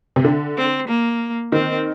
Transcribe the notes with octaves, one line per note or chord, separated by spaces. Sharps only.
C3
D3
C4
A#3
D#3 C4